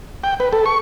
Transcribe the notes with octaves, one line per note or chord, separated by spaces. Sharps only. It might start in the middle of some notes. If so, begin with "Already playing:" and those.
G5
B4
A4
C#6